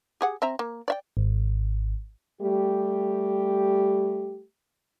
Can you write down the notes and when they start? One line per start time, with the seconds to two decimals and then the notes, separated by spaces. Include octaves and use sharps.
0.21 G4 G#4 F#5
0.42 C4 E5 A#5
0.59 A#3
0.88 D5 E5 G5
1.17 G#1
2.42 G3 A3 G4